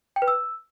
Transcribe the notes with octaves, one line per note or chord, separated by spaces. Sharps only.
G5
B4
E6